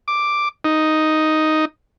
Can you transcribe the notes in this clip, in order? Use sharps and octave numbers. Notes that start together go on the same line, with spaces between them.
D6
D#4